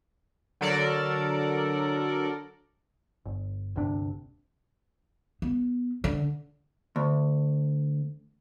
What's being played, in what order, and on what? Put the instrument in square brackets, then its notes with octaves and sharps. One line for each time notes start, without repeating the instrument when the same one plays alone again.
[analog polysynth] D3 F#3 A4 A#4 D5
[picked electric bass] G1
G1 D2 C3 D4
[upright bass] B3
D3
[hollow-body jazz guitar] D2